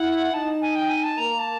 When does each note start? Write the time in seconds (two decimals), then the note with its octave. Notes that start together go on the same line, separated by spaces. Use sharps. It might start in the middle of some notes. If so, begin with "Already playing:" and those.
Already playing: E4 F#5
0.33 D#4 A5
0.62 G#5
0.75 G5
0.89 G#5
1.03 A5
1.18 A#3 A#5
1.39 A5